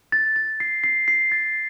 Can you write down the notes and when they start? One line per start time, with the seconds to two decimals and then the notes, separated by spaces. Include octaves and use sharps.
0.12 A6
0.36 A6
0.60 C7
0.84 C7
1.08 C7
1.32 A6